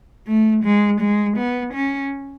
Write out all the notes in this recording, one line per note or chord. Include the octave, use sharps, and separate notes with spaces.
A3
G#3
G#3
B3
C#4